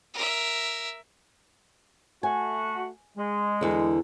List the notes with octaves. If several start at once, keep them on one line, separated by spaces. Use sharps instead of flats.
A#4 E5
A3 F#4 G#5
G#3
E2 D3